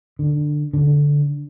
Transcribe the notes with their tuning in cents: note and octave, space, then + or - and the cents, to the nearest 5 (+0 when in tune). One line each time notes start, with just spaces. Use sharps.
D3 +15
D3 -10